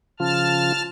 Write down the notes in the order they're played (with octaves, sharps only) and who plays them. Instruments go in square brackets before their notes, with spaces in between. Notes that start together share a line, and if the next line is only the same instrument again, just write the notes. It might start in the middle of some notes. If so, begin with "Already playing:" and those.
[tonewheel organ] C#3 F3 F4 [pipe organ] A5 F6